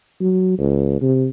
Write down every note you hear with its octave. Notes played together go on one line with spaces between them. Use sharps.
F#3
C#2
C3